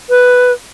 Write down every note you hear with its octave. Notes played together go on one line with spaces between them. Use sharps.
B4